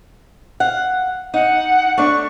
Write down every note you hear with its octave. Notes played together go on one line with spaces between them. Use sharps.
F5 F#5
D#4 F#5
A3 D4 C#6